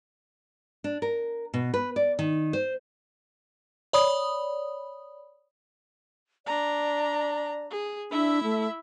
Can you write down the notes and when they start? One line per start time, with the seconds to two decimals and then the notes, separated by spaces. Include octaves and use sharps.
0.84 D4
1.02 A#4
1.54 B2
1.74 B4
1.96 D5
2.19 D#3
2.53 C5
3.93 C#5 D5 B5 D#6
6.46 D4 D5 A#5
7.71 G#4
8.11 D4 E4 E5
8.43 A3